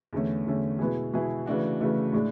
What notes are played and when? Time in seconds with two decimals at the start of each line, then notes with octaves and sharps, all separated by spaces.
0.13 E2 D3 A3 C#4
0.46 E2 D3 A3 C#4
0.79 B2 G#3 B3 E4 G#4
1.14 B2 G#3 B3 E4 G#4
1.46 C#3 E3 A3 D4 F#4
1.80 C#3 E3 A3 D4 F#4
2.13 A2 G#3 D4